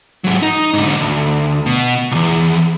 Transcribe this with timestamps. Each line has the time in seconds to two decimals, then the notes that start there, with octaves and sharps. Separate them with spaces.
0.24 G#2 F#3
0.42 D#4
0.73 G#2 D3
1.01 D2
1.66 B2
2.11 B1 E2